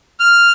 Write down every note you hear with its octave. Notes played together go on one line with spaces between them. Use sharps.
F6